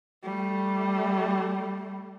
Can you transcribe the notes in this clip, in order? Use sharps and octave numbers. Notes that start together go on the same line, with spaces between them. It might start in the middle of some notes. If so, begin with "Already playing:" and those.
G3 A3